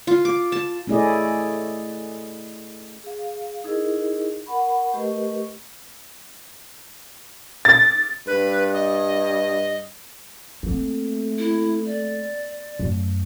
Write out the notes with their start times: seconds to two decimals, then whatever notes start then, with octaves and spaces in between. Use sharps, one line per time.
0.07 F4
0.25 D6
0.52 A5
0.87 A3 C#4 E4 G#4 D5 D#5
3.04 G#4 F5
3.64 D#4 E4 G#4 A#4 D#5
4.46 A#4 F#5 B5 C#6
4.94 A3 G4 A#4 B4 D#5 C#6
7.65 A6
8.27 G2 B4
8.73 D#5
10.63 A3 A#3 C4
11.38 E4
11.86 D5
12.79 F#2 A3